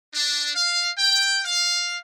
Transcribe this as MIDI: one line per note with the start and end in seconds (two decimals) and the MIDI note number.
0.14 0.51 62
0.54 0.89 77
0.96 1.40 79
1.44 1.97 77